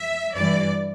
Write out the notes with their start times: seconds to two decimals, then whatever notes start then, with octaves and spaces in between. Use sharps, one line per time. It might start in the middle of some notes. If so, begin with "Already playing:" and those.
Already playing: E5
0.35 G2 E3 G3 D5